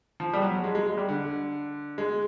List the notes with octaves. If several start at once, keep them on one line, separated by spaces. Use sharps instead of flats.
F3
G3
F#3
G#3
G#3
G#3
G3
D3
G#3